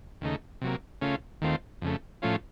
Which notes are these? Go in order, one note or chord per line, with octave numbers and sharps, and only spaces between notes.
D#2 C#3 A3 D#4
C3 F#3 A#3
C#3 A3 C#4 F4
D#2 D#3 A3 C4 F4
F2 C#3 A3
A2 F3 A3 C#4 F4